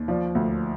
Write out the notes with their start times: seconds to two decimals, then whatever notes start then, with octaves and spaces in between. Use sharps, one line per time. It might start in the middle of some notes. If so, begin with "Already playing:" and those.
Already playing: D#2
0.08 F3 D5
0.35 D2